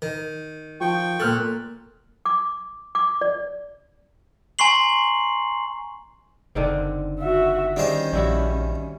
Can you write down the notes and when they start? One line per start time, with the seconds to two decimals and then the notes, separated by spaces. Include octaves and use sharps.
0.02 D#3
0.81 F3 G5 C#6
1.20 A#2 A4 F6 F#6
2.26 D6
2.95 D6
3.21 D5
4.59 G#5 A#5 C6 C#6 C7 F#7
6.55 F#1 D3 D#3 C4
7.19 F#4 E5
7.76 D#3 G3 C#4 D#4 G#4 C5
8.13 A#1 G3 E4 F#4